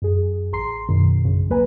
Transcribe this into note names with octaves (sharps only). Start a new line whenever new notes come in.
F#2 G#4
A1 G#4 A#5 C6 C7
F#2 B2 D#3 F#3
A#1 F#2 C#3
D#2 F#3 A#3 B4 G#5 A#5